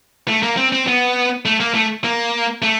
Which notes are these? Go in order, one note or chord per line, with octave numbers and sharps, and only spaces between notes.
A3
A#3
C4
C4
B3
A3
A#3
A3
A#3
A3